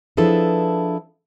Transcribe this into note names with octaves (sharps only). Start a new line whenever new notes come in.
F3 D4 E4 G#4 A4 B4